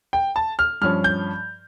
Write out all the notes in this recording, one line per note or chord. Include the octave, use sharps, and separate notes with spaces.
G5
A5
F6
G2 F3 C#4 F6
G6